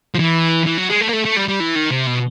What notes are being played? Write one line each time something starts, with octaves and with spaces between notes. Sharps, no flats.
F3
E3
E3
F#3
G#3
A3
A#3
A3
A3
G3
G3
E3
D#3
C3
B2